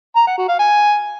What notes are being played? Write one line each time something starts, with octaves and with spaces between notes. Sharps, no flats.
A#5
F#5
F#4
F5
G#5